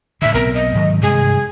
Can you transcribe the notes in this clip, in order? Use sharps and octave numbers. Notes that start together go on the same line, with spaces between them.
A2 D3 E5
B1 B3 C4 A#4
D#5
G#2 D#3 F#3
G2 C3 G#3 G#4